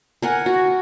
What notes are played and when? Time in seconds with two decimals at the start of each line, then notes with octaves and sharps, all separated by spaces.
0.22 A#4 F#5 G#5
0.46 F#4